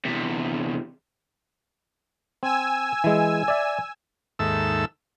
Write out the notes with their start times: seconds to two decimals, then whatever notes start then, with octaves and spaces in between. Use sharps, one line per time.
0.05 E2 C3
2.43 C4 G#5 E6
3.04 E3 G#3
3.48 D5 E5
4.39 D#2 G#2 A4 E5 E6